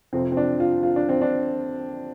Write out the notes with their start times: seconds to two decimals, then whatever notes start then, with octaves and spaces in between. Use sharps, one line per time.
0.13 F2 C3 F3 C4
0.32 C4
0.37 D4
0.60 F4
0.83 F4
0.96 D4
1.09 C4
1.21 D4